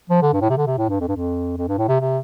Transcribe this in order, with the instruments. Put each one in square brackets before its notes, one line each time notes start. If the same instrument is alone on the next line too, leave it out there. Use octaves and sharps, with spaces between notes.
[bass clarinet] F3
D3
G2
A2
C3
D3
C3
A2
G2
F2
G2
F2
F2
G2
A2
C3
C3